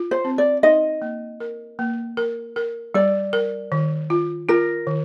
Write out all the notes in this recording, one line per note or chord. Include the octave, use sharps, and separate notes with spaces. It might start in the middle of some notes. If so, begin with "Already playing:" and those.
Already playing: F4
C5
C4
D5
D#4 D#5
A#3
A#4
A#3
A#4
A#4
G3 D5
A#4
D#3
F4
F4 A#4
D#3